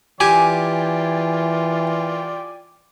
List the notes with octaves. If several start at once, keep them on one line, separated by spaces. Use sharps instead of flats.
E3 F4 G4 D5 G5 G#5